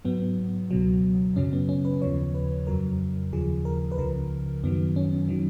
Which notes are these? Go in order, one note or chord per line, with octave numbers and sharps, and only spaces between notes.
G#2 F#3 B3
C#2 B2 F#3
F#2 C#3 F#3 C#4
B3
C#4
B4
D#2 C#3 F3 C#5
B4
F2 C#3 F#3 A#4
D#2 C#3 F3 G#4
A#4
B4
C#2 C#3 F3 A#4
F#2 D#3 F#3 B3
C#4
D#3 F#3